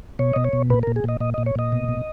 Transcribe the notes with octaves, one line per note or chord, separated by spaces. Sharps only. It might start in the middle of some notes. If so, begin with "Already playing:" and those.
B2 C#5
B2 D#5
C#5
B2
A#2 B4
A#4
A#2
G#4
A#2 D#5
A#2 D#5
A#2 D#5
C#5
A#2 D#5
B2
B2